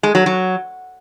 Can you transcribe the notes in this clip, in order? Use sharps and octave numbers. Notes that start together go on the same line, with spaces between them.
G#3
F#3
F#3